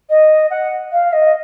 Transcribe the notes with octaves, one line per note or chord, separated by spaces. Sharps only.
D#5
F#5
F5
D#5